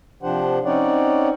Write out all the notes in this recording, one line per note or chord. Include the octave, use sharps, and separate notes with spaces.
C3 F3 D4 G4 C5 F#5
C4 C#4 D#4 C#5 D5 F#5